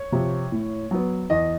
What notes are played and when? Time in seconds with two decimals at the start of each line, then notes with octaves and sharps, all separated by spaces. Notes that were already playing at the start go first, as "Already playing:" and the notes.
Already playing: C#5
0.12 C3 F3
0.52 A2
0.91 F#3 B3
1.30 E2 D#5